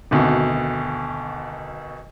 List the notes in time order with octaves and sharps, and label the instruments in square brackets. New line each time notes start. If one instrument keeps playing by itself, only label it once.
[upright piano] G#1 D2 B2